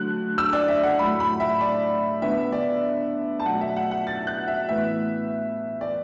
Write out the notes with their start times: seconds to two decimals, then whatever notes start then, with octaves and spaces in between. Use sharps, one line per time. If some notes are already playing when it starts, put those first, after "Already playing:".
Already playing: D3 F#3 A3 F#6
0.38 E6
0.53 D5
0.68 E5
0.83 F#5
0.99 A2 F#3 A3 B5
1.20 B5
1.40 E5
1.61 D5
2.22 D3 B3 E5
2.52 D5
3.40 A5
3.46 B2 F#3 A3 F#5
3.61 E5
3.76 F#5
3.91 F#5
4.07 A6
4.27 F#6
4.48 E5
4.68 A2 E3 B3 E5
5.81 D5